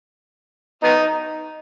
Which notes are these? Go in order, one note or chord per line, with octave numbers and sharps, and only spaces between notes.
B3 D#4